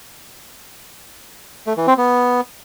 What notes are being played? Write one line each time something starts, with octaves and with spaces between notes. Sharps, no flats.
A3
E3
C4
B3